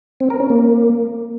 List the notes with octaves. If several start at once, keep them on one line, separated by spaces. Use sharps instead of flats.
C4
A#4
C#4
A#3